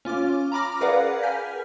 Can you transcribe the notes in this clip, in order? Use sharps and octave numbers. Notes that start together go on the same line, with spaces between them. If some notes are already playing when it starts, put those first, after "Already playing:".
C#4 F4 D6 F6
A#5 B5 D6 F6 A#6
G#4 A#4 B4 D5 F5 F#5
G#5 F6 G6 B6